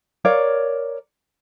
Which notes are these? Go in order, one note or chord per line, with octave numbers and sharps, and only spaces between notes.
A#4 C#5 D5 F5